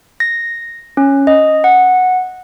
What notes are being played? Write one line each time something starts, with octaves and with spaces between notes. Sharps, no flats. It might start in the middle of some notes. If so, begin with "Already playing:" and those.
A#6
C#4
D#5
F#5